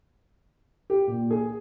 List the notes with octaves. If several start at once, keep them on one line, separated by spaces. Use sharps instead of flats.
G4
A#2
G#4